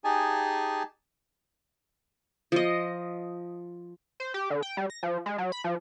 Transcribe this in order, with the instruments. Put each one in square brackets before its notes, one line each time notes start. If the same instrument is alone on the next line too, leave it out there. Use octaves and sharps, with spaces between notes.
[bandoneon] D#4 G4 G#4 G#5 A5
[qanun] F3 D#5
[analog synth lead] C5
G4
D3
G5
G3
A#6
F3
G#3
F#3
B5
F3